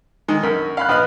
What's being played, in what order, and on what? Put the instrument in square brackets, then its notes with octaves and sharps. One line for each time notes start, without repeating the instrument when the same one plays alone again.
[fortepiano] D3 D#3 G#3
[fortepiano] F#2 [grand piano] A#4
[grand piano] F5 B5 F#6
[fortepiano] A#1 B4 F6 [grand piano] D#5 F5 B5